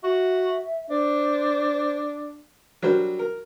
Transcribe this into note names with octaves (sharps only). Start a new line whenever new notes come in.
F#4 E5
D4 C5
F#3 G3 D4 A#4 C5
A#4